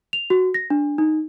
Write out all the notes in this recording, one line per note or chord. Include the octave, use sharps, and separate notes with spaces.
F7
F#4
A#6
D4
D#4